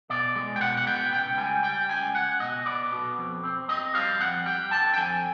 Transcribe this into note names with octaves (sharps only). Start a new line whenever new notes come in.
B2 D5
G#3
G5
B2 F#5
F#5
B3 G5
C#2 G5
G3 G#5
G3 G5
C#2 G#5
C#2 F#5
B2 D#5
B3 D5
B2
F2
C4
C4 D#5
G3 F5
F2 F#5
G3 G5
D3 A5
G5
F2 G#5